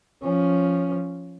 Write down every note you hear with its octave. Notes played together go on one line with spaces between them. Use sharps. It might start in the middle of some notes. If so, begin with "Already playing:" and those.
F3 C#4